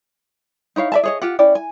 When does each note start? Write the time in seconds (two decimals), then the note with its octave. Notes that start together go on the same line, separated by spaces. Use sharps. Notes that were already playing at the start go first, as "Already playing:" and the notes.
0.76 D#4 E4 C#5 F5
0.92 D5 E5 A5
1.03 G#4 C#5 D#5
1.21 F4 G4 F#5
1.39 C#4 E4 D5 G5
1.55 G#5